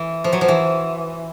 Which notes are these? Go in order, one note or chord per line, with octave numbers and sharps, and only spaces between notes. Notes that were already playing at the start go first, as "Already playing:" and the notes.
Already playing: E3
F3
F#3
F3
E3